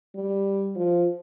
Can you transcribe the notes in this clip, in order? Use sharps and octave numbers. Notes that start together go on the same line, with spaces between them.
G3
F3